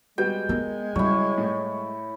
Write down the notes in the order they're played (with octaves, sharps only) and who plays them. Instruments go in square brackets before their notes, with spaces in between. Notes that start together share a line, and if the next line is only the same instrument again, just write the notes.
[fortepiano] G3 B3 F#4 [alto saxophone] G#3 [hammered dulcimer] G5
[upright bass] B3 [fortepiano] A#4
[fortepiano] C#3 F#3 [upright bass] G3 [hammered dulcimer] E4 C#5
[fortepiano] A2